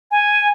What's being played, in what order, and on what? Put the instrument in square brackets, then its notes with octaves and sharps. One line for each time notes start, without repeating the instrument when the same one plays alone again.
[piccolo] G#5